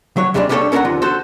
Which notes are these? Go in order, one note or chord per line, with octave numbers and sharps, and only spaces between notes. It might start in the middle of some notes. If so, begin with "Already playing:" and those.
F#3 C#5
D#2 C3 G3 G#3 C4 D4
G3 A#3 D4 D#4 A4 C#5
C#4 A4 A#4 F5 F#5 A#5
D#2 D3 F3
F#4 A4 C5